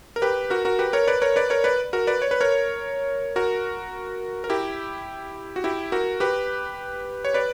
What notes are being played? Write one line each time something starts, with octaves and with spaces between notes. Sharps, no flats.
A#4
G4 B4
F#4 A#4
F#4 A#4
G4 B4
A#4 C#5
B4 D5
A#4 C#5
B4 D5
A#4 C#5
B4 D5
F#4 A#4
B4 D5
C#5
B4
A#4 C#5
F#4 A#4
A#4
E4 G4
F#4
E4 G4
F#4 A#4
G4 B4
C#5
B4 D5